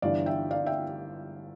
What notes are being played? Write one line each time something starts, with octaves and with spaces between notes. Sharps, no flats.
G1 G2 E3 D5 F5
E5 G5
D5 F5
E5 G5